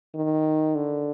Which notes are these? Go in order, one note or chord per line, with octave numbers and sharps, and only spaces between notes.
D#3
D3